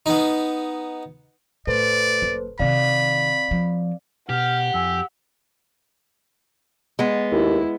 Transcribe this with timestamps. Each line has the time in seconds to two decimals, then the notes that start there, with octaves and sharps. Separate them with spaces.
0.06 B3 D#4
1.67 A2 A4 B4 C5 D5
2.22 F#1
2.59 C3 D#3 C4 D5 F5 B5
3.51 F3
4.29 B2 G4 F#5 F6
4.74 F2 G#5 E6
6.99 G#3 B3
7.32 D#2 E4